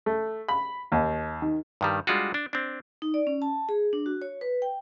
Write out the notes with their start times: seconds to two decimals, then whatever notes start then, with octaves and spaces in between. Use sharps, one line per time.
0.06 A3
0.48 B5
0.92 D#2
1.42 D#3
1.81 G2 D#3 G3
2.07 G3 G#3 D4 F4 F#4
2.34 D4
2.53 C4 D4
3.02 D#4
3.14 D5
3.27 C#4
3.42 A5
3.69 G#4
3.93 D4
4.06 F#4
4.22 C#5
4.41 B4
4.62 G5